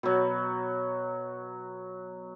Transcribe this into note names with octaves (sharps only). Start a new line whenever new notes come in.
B2 F#3